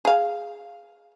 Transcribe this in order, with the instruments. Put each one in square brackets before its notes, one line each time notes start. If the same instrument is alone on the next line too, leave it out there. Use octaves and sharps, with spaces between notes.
[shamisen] G#4 F5